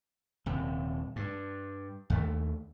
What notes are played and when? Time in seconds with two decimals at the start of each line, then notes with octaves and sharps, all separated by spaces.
0.46 D#1 C3
1.16 G2
2.10 D#2 A3